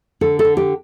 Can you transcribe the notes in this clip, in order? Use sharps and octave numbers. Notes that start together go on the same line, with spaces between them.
D3 A4
A4
D3
G4